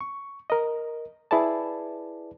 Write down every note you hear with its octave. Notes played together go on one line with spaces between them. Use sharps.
C#6
A#4 D#5
E4 G#4 B4 D5 A5